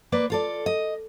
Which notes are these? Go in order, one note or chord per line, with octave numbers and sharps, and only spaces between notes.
A#3 B4 D5
F4 A4 D5
D#5